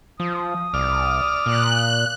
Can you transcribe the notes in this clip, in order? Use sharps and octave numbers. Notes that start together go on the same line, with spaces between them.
F3 D#6
C2 D5 F6
A#2 F#6